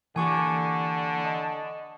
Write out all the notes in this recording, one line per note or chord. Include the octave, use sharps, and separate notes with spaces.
D3 E3 A#3 G4 G#5 C#6 D6
D#5 A5